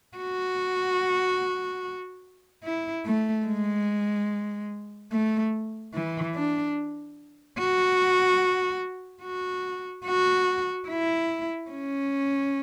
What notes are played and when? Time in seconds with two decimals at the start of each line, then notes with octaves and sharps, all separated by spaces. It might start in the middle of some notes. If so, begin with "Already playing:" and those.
0.17 F#4
2.64 E4
3.06 A3
3.46 G#3
5.12 A3
5.94 E3
6.35 D4
7.59 F#4
9.23 F#4
10.06 F#4
10.88 E4
11.70 C#4